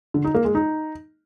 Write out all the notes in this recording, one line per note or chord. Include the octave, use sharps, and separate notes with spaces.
D3
D#4
A#3
G#3
D#4